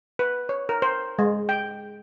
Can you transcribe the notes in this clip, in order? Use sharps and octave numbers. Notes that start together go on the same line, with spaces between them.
B4
C#5
A#4
C5
G#3
G5